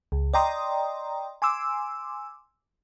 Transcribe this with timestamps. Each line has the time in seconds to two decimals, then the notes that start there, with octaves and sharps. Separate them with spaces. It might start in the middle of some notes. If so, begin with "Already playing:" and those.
0.12 C#2
0.34 D5 D#5 G5 A#5 C6 D#6
1.42 G#5 C6 D6 E6